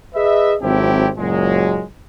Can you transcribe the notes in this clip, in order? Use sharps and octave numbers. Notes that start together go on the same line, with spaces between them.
G#4 B4 D#5 E5
G#1 F#3 C4 E4 G4 A4
F#1 A#2 F#3 G#3